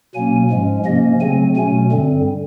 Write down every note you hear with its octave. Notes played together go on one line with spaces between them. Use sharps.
B2 F#3 A#3 C#4 G#5
G#2 F3 G#3 C#4
C3 F3 A#3 C#4 D#5
C#3 F#3 A3 C4 G#5
B2 F#3 A3 C#4 G#5
G2 D3 G3 C4